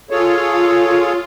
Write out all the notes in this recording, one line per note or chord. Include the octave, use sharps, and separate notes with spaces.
F4 G#4 A4 C#5